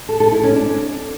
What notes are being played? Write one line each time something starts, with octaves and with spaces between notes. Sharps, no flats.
A4
A4
E4
C#4
D4